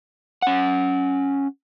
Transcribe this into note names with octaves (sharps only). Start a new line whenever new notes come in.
C#4 F#5